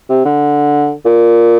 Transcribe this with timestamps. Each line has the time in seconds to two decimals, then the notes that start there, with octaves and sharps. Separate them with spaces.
0.09 C3
0.25 D3
1.05 A#2